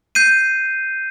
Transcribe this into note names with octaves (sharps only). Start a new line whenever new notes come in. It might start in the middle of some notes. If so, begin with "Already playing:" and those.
G6 C7 D#7